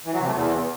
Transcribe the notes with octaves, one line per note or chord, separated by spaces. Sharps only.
E3
F#3
C3
A3
E2